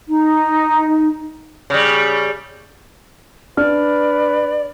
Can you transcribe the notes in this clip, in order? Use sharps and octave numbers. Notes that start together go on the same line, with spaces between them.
D#4
C#3 G3
D4 B4 D5 F6